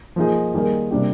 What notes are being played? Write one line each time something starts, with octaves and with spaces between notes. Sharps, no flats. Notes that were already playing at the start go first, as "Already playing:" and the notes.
F3 A#3 D#4 G#4
D#3 G3 A#3 D#4 G#4
C3 G3 A#3 D4 G4